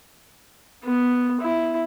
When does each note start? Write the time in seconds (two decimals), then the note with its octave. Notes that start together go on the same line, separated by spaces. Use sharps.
0.84 B3
1.41 E4